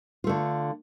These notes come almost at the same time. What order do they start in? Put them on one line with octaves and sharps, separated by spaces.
F4 A3 D3